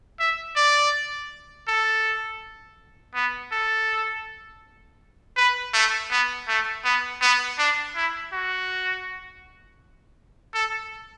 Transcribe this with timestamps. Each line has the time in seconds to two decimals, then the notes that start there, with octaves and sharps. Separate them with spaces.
0.20 E5
0.56 D5
1.68 A4
3.15 B3
3.52 A4
5.37 B4
5.74 A3
6.11 B3
6.48 A3
6.84 B3
7.21 B3
7.59 D4
7.96 E4
8.33 F#4
10.54 A4